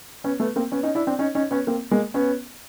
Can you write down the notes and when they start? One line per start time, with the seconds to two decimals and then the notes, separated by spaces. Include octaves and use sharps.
0.24 B3 C#4
0.40 A3 B3
0.56 A#3 C4
0.72 B3 C#4
0.83 C#4 D#4
0.95 D4 E4
1.07 C4 D4
1.19 C#4 D#4
1.35 C#4 D#4
1.51 B3 C#4
1.67 A#3 C4
1.91 G#3 A#3
2.14 B3 C#4